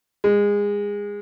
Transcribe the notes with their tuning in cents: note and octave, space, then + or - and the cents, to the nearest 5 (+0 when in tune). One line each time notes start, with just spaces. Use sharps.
G#3 -25